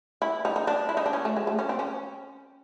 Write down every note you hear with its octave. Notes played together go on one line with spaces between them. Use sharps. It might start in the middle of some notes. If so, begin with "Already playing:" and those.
E4
D#4
D#4
D4
E4
D#4
D4
C#4
A3
G#3
A3
C#4
C4
C#4